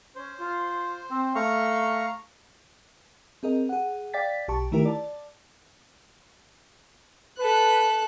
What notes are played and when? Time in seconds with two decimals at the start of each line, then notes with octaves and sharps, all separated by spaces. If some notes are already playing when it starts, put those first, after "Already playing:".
0.16 C#4 C5
0.40 F4
1.11 C4
1.35 A3 F5 A#5 C#6
3.43 C4 G#4 A#4 D#5
3.69 G#4 F#5
4.14 D5 F5 G5 A6 B6
4.48 B1 G4 A5 C#6
4.72 D3 D#3 A3 E4 G4 A#4
4.85 D5 A5
7.39 A4 B4 F#6